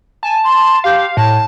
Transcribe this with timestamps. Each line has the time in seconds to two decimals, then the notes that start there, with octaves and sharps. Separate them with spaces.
0.23 G#5 A5
0.43 C6
0.84 G4 F5
1.17 A2 A5